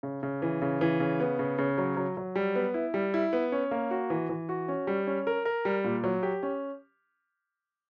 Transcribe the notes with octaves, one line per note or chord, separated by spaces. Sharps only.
C#3
C#3
E3
C#3
E3
C#3
B3
C#3
C#3
F#3
F#3
F#3
G3
B3
E4
G3
E4
B3
C#4
A#3
F#4
E3
E3
F#4
C#4
G3
C#4
A#4
A#4
G3
A#2
F#3
G4
C#4